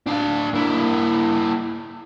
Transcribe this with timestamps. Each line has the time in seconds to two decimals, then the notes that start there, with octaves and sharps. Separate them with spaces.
0.07 D4 F5
0.54 A#3 E4